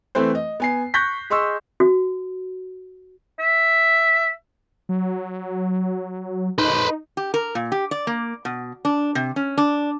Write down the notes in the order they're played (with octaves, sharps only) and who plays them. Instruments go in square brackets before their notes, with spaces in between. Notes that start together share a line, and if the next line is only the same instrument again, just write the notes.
[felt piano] E3 A3 C4 B4 C5
D#5
B3 G#5 C7
C#6 F#6 G6 A#6 B6
G#4 D#5 C6 C#6 E6
[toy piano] F#4
[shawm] E5
[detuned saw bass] F#3
[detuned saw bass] D#4 [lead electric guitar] B4 C5
[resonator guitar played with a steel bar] G4
A#4
A#2
G4
D5
A#3
B2
D4
C3
C#4
D4